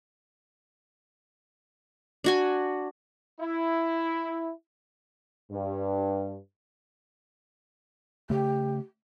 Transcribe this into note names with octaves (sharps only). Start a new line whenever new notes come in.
D4 F#4 G#5
E4
G2
C#3 A3 G4